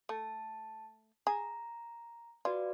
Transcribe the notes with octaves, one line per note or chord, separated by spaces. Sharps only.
A3 A5
G#4 A#5
F4 F#4 B4 D5